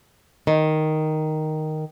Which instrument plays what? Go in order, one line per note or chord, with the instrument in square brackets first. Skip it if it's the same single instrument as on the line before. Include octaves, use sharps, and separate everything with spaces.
[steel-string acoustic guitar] D#3